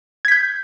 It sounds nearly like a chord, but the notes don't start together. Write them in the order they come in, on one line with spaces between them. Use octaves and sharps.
G#6 B6 G6